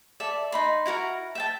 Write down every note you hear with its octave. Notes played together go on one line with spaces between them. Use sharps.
A4 D5 E5
D#4 B5 C6
E4 F#4 A#4 A#5
E5 G5 A5